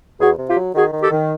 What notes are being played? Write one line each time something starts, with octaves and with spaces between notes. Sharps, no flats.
E2 F#4 G#4
C3
F4 G4
F#3
D#3 F#4 G#4
D#3
G4 A4
D#3